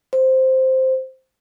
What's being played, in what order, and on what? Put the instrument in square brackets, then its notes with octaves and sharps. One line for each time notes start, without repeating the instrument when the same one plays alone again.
[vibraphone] C5